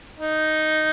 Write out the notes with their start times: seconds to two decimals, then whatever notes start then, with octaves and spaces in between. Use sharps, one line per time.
0.18 D#4